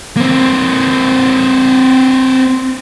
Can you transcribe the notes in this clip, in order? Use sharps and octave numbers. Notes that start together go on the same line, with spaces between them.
A#3 C4